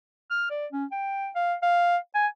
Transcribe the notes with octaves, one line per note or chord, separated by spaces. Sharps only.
F6
D5
C#4
G5
F5
F5
G#5